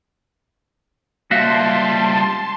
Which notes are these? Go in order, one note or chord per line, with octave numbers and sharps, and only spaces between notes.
C#2 G3 A#3 F#4 E5 F5 A5 C6